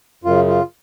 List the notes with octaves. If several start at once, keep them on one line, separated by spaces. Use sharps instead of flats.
F#2 C#3 F4
F4